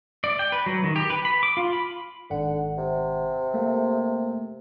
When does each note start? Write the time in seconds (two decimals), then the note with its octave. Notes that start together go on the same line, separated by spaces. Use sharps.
0.24 D5
0.39 G5
0.52 B4
0.66 F#3
0.84 D#3
0.96 G4
1.10 B4
1.25 B5
1.43 D6
1.57 F4
1.73 B5
2.30 G#1 D3 F#5
2.78 C3
3.54 A3 A#3